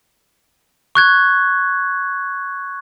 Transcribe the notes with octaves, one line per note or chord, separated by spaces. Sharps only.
C#6 F#6 G#6